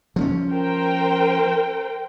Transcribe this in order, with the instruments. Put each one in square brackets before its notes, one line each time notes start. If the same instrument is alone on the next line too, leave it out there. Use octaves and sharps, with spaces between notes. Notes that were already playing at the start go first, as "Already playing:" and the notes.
[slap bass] F3 C4 C#4
[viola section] A#4 C5 G5